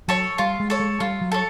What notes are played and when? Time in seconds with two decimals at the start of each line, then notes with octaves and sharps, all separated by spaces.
0.08 F#3 A4 C#5
0.38 G3 F4
0.60 G#3
0.70 A4 C#5
0.80 G#3
1.00 G3 F4
1.22 F#3
1.32 A4 C#5